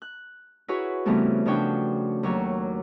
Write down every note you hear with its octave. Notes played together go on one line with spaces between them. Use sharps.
F#6
E4 F#4 G#4 B4 C#5
C#3 E3 G3 A3 B3 C4
C#3 F3 D4 F#4 C#5 G5
D#2 F#3 F#4 C#5